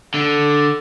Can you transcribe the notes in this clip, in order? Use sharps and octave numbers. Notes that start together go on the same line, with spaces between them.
D3